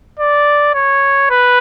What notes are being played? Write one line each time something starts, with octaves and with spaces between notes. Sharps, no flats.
D5
C#5
B4